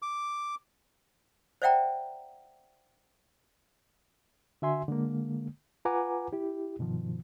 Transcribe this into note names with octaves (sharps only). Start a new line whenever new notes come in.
D6
C5 D5 E5 F#5 G5 A#5
D3 F#4 E5 G#5 C6
D3 G#3 A#3
F4 B4 F#5 G#5 A#5 D6
E4 G4
G2 B2 D#3 F3